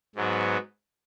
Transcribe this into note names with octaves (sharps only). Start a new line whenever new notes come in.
G#2 F#3 B3